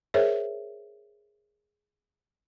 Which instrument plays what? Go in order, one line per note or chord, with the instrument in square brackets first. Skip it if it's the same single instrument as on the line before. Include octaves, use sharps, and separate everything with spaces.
[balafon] G#4 A#4 C5 C#5 E5